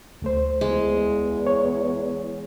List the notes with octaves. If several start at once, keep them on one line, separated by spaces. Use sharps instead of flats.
D2 A3 C5
E2 G#3
C#5